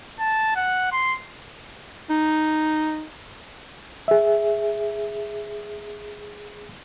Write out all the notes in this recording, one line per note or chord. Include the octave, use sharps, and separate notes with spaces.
A5
F#5
C6
D#4
G#4 E5